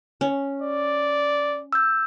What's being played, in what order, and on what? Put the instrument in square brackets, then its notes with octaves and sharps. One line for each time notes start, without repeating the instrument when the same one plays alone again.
[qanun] C#4
[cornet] D5
[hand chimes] E6 G6